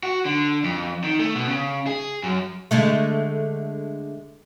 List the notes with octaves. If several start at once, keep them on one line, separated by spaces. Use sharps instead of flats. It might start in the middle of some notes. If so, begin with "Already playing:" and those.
F#4
D3
F2
D#3
A3
B2
C#3
G#4
F#2
D3 G#3 A3